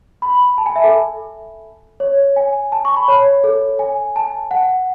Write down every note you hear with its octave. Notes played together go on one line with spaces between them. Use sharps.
B5
A5
G#5
E5
A4
C#5
G#5
A5
C#6
B5
C#5
A4
G#5
A5
F#5